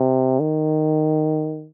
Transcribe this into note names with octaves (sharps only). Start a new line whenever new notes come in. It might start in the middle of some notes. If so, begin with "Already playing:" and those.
Already playing: C3
D#3